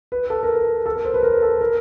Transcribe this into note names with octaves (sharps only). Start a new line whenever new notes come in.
B4
A4
A#4
A4
A4
A#4
C5
B4
A#4
A4
A#4